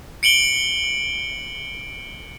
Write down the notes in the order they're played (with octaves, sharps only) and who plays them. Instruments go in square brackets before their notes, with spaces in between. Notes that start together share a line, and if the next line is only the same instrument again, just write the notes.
[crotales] C#7 D7 F#7 G7